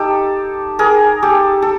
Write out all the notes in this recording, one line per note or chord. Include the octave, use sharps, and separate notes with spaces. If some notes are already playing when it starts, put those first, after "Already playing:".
Already playing: D#4 G4 A4
G#4 A#4
G4 A4
A4